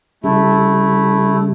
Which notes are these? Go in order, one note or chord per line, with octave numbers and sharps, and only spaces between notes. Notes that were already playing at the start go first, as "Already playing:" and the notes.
C#3 G3 A3 E4